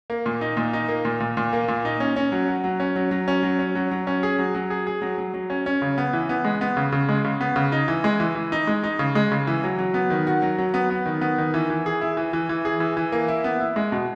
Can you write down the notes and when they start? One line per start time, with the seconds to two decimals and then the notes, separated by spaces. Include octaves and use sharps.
0.10 A#3
0.26 A#2
0.41 D#4
0.57 A#2
0.73 D#4
0.88 A#3
1.05 A#2
1.20 A#2
1.37 A#2
1.53 A#3
1.68 A#2
1.85 D#4
2.00 C#4
2.16 C#4
2.32 F#3
2.48 F#4
2.64 F#3
2.80 C#4
2.96 F#3
3.11 F#3
3.28 C#4
3.43 F#3
3.59 C#4
3.75 F#3
3.91 F#3
4.07 C#4
4.23 G#4
4.39 F#3
4.55 F#3
4.70 G#4
4.87 G#4
5.02 F#3
5.18 F#3
5.34 F#3
5.50 C#4
5.66 C#4
5.82 C#3
5.98 B3
6.13 E3
6.29 B3
6.45 G#3
6.61 B3
6.77 C#3
6.92 C#3
7.09 G#3
7.25 C#3
7.41 B3
7.56 C#3
7.72 D#4
7.88 E3
8.04 G#3
8.20 E3
8.35 E3
8.52 D#4
8.67 G#3
8.84 D#4
8.99 C#3
9.15 G#3
9.32 C#3
9.47 E3
9.63 F#3
9.79 F#3
9.94 B3
10.10 D#3
10.27 F#4
10.42 F#3
10.58 F#3
10.74 B3
10.90 B3
11.06 D#3
11.21 B3
11.38 D#3
11.54 E3
11.70 E3
11.86 G#4
12.01 E4
12.17 E3
12.33 E3
12.49 E3
12.65 G#4
12.80 E3
12.97 E3
13.12 A#3
13.28 E4
13.44 B3
13.60 E4
13.76 G#3
13.92 B2